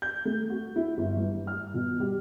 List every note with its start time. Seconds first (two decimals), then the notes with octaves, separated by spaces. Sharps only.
0.02 G6
0.25 A3
0.50 F#4
0.76 E4
0.97 G1
1.17 G2
1.47 F6
1.74 B2
2.00 G3